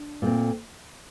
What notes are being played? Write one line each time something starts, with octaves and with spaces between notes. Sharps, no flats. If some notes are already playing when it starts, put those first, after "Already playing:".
Already playing: D4
A#2 A3 C4